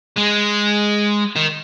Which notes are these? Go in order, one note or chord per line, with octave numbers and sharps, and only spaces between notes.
G#3
D#3